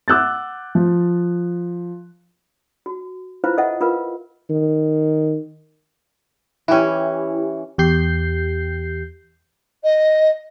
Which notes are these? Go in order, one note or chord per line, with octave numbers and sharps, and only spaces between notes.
F#5 D6 E6 F#6 G6 A6
F3
F#4
E4 F4 B4 C5 F5
A4 D#5 E5 F#5
F4 A#4 B4 F5
D#3
E3 C#4 E4 G4
E2 G4 G6 C7
D#5